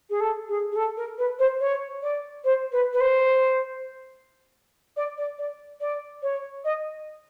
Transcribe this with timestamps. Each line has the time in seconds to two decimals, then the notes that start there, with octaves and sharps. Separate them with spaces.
0.10 G#4
0.20 A4
0.48 G#4
0.72 G#4
0.76 A4
0.97 A#4
1.18 B4
1.39 C5
1.60 C#5
2.02 D5
2.44 C5
2.72 B4
2.93 B4
3.00 C5
4.97 D5
5.17 D5
5.39 D5
5.81 D5
6.23 C#5
6.64 D#5